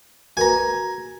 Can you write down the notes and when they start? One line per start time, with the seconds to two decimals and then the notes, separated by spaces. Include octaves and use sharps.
0.37 F#4 A#4 B4 G#5 A#5